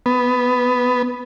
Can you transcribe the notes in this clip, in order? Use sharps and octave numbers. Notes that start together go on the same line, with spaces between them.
B3